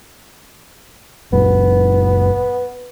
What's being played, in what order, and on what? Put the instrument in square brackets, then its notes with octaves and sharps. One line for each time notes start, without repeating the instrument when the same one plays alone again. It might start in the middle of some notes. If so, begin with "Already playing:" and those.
[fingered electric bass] F#1 F#2 A#2 [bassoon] B3